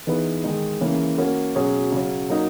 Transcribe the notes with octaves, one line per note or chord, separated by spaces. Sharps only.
E3 B3 D#4 G#4 B4
D#3 G#3 D#4
C#3 E3 A#3 C#4
A#3 C#4 F#4 A#4
B2 F#3 C#4 G#4 C#5
C#3 F#3 C#4
F#3 A#3 D#4